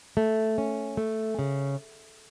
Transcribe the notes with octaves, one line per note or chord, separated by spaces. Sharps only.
A3
C#4
A3
C#3